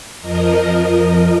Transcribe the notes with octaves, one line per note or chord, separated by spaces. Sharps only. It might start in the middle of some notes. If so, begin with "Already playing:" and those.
F2 F3 A#4 D#5